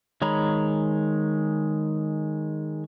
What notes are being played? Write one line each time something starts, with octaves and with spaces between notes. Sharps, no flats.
D#3 G#3 C#5 A#5 B5